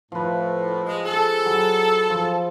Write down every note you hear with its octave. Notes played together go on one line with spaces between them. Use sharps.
A2 F3 B4
G#3
G#4 A4
F#3
F3